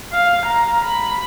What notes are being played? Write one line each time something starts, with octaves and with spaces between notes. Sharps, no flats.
F5
A#5
B5